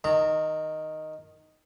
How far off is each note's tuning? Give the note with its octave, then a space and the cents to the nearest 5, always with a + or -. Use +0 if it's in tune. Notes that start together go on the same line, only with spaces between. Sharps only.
D#3 +0 A#5 -25